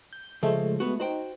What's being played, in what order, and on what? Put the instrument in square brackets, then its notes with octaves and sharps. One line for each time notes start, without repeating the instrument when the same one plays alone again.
[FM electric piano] G6
[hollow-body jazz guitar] C#3 F3 [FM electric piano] G#3 A3
[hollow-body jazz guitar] B3 F#4
[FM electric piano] D#4 [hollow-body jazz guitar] F#4 C5 G5